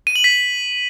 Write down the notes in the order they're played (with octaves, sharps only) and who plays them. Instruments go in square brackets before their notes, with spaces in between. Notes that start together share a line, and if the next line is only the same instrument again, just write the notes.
[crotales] D#7
F#7
B6